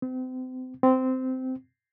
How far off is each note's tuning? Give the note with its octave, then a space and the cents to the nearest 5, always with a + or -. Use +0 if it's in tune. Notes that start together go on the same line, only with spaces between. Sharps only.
C4 -35
C4 -15